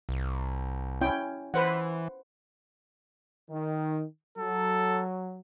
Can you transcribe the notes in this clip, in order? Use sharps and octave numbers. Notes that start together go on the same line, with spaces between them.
C2
C#4 E4 G5
E3 B4 C5 F#5
D#3
F#3 A4